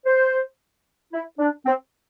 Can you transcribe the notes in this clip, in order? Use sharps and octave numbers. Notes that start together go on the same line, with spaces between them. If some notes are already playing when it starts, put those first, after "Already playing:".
C5
E4
D4
C4